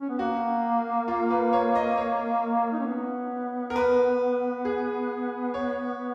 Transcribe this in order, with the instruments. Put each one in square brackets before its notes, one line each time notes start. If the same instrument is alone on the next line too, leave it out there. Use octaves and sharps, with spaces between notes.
[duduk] C#4
B3
[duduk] A#3 [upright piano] F#4
[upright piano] F4
B4
C#5
D#5
C#5
[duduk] D#4
C#4
B3
[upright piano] A#4
B4
G#4
C#5